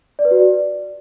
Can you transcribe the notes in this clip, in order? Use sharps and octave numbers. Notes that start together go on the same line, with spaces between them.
D5
B4
F#4
D5